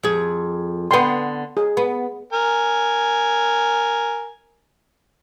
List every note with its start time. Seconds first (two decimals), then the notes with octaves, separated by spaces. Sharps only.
0.03 F2 G#4
0.91 D3 B3 G5 C6
1.57 G#4
1.77 B3
2.33 A#4 G#5